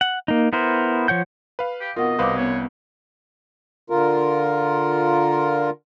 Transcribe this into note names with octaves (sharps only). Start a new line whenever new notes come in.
F#5
A#3 D#4
B3 E4 A#4 C5
F3 C#5 F#5 G6
B4 F5
G4
F2 B2 D#4 F4 A#4 D#5 F#5
C2 B4 C5 F5 D6
B3 C#4 G4 C#5
D3 F4 A#4